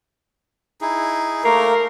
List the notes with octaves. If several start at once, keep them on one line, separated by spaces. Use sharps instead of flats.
D#4 E4 G#4
A3 A#3 A#4 F5